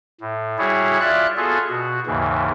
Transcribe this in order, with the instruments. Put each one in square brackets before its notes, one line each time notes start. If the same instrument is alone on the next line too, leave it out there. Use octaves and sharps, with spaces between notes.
[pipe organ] A2
G3 E4 F#4 G#4 C#5
F4 D5 E5 F#6
B3 F4 F#4 G#4 A4
B2 F#4
D#2 G#2 C#3 E3